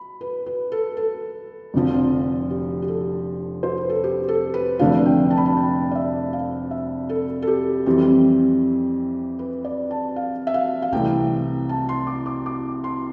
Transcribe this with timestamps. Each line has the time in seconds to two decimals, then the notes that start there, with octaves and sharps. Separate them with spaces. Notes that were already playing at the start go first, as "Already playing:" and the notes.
Already playing: B5
0.21 B4
0.46 B4
0.72 A4
0.97 A4
1.74 F1 F2 D3 F3 C4
2.50 G4
2.82 G4
2.88 A4
3.63 C5
3.77 B4
3.89 A4
4.04 G4
4.28 A4
4.54 B4
4.79 F1 F2 D3 A3 D4 F5
5.06 G5
5.31 A5
5.37 B5
5.46 A5
5.57 G5
5.91 D5
5.95 E5
6.33 F5
6.71 E5
7.09 A4
7.42 A4
7.47 G4
7.86 F2 E3 G3 C4
9.39 B4
9.64 D5
9.91 A5
10.16 F5
10.47 E5
10.54 F5
10.82 F5
10.92 C2 C3 E3 A3 G5
11.69 A5
11.89 C6
12.07 D6
12.26 D6
12.46 D6
12.84 C6